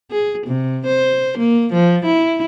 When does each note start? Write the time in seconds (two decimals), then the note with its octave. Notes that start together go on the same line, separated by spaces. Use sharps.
0.11 G#4
0.46 C3
0.86 C5
1.38 A#3
1.73 F3
2.05 E4